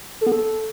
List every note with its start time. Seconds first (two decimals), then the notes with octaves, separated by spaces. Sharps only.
0.21 A4
0.26 B3
0.32 A4